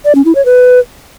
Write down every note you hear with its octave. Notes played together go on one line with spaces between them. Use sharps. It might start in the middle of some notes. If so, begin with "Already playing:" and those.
D5
C#4
E4
C#5
B4